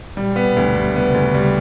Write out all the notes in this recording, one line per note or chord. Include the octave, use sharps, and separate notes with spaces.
A#2 G3
B3
B2
D2
D3 G3
C#3
C3 B3
C#3
D2
C3
C#3 G3